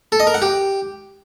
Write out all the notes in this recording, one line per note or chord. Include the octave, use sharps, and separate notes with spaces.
A4
D#5
A#4
F#5
G4